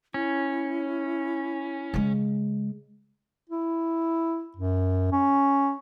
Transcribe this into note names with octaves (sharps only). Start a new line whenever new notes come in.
C#4 E4
C#3 G#3
E4
F#2
C#4